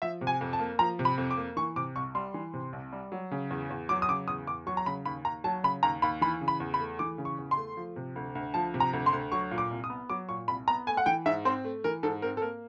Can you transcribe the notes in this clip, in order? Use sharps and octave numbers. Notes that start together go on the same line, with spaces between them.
F3 E5
C3
G#5
F2
A5
A#3
F3 A#5
C3
B5
F2
D6
A#3
E3 C#6
C3 D6
C2 C#6
G3 C6
E3
C3
C2
G3
F#3
C#3
E2
E2
F#3 D6
D#6
C#3 D6
E2 D#6
E2 D6
F#3 C#6
A#5
C#3 B5
D#2 B5
D#2 A#5
F#3 A5
C#3 B5
D#2 A#5
D#2 B5
E3 B5
C#3
B5
E2
B5
A3
E3 D6
C#3
C#6
E2
C6
A3
F3
C3
D2
D2
F3 A5
C3
A#5
D2
C6
D2
F#3 C#6
A#2
D6
C2
D#6
B3
F#3 D6
A#2 C#6
C2 B5
B3 A#5
A3 G#5
F#5
E3 G5
G#2 E5
C4 C5
A3
E3 A#4
G#2 A4
C4 A#4
A4
A#3 A#4